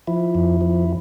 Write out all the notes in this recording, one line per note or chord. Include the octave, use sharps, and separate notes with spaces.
F3 E4
F2
F3